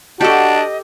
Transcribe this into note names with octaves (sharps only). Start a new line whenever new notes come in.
D4 F#4 G4 A4 D#5